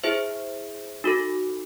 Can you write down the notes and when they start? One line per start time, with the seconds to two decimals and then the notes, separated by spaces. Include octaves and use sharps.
0.04 E4 G#4 C5 E5
1.04 D#4 F#4 A4